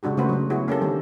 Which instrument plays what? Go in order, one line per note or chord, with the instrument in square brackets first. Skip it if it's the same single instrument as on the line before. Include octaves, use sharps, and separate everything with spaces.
[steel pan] C#3 G#3 D4 F#4 G4
C#3 A3 C#4 F#4 B4 C5
C#3 F#3
B3 E4 F#4 G#4 C#5
A#3 C#4 G4 A4
D3 D#3 G3 C4